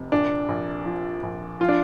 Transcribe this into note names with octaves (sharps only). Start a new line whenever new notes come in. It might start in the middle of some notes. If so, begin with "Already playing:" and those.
Already playing: F1 C3
A#1 D4
A#1
F3
A#1
F3 F4
D4